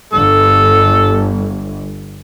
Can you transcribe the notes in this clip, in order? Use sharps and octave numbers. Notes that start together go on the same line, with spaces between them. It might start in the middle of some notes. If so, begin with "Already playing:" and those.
G1 A4